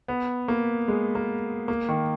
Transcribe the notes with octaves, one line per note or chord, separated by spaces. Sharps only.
B3
A#3
G#3
A#3
A#3
D#3